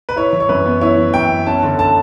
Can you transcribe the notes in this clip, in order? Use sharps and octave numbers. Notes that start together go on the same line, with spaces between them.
B4
E4 C#5
E3
C#5
F#2 B4
B3
E4 C#5
E3
F#2 G5
B3
C#4 A5
D3
A5